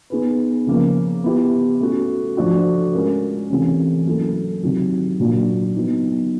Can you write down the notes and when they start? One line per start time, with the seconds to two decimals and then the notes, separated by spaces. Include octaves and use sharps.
0.10 B3 D#4 G#4 B4
0.67 C#3 F3 A#3
1.23 B3 E4 G4
1.80 A3 C#4 F#4
2.37 F3 A3 D4 F#4
2.93 G#3 C#4 F4 A#4
3.50 C3 E3 A3 C#4
4.06 F#3 A#3 C#4 E4 A4
4.63 C3 D#3 F#3
5.19 A#2 F#3 A#3 D4 F4
5.76 F#3 B3 D#4